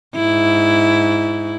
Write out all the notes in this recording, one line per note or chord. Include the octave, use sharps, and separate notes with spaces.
G#2 E4